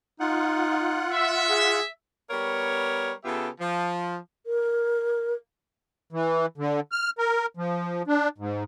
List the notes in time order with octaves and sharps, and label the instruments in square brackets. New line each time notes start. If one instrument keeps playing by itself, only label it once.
[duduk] D#4 [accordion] F4 F#5
[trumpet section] E5
[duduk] G#4
[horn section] G3 B3 A#4 C#5
C#3 B3 F4 G4 A4 E5
F3
[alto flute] A#4
[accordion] E3
D3
F6
A#4
F3
D4
G#2